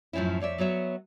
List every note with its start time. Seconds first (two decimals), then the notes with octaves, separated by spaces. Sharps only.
0.13 F#2 A2 F3 C#4 E4
0.40 F2 C#5 D5 E5
0.58 F#3 B3 C#5 E5